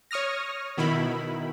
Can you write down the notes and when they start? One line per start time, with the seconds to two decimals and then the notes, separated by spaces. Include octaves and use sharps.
0.11 C#5 C#6 D#6 F6 A#6
0.78 B2 D#3 E4 B5